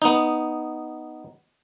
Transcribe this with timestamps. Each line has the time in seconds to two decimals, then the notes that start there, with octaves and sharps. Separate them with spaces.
0.02 B3 D#4